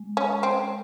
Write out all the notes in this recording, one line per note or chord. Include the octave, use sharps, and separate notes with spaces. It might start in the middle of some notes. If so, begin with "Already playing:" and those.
Already playing: G#3
C#4
C4